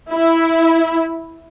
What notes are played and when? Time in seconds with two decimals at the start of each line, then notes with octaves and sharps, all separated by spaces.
0.10 E4